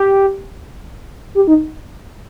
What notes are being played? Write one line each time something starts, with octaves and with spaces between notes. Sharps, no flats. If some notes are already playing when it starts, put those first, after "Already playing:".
Already playing: G4
G4
D#4